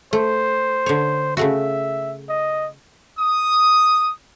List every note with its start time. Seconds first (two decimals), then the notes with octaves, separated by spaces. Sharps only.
0.13 A3 C5
0.86 D3 C#5
1.37 C#3 A3 F#4 E5
2.29 D#5
3.18 D#6